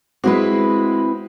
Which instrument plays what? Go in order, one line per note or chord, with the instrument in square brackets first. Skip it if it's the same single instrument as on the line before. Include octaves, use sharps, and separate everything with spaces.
[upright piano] G#3 F#4 [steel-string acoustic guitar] C4 E4 B4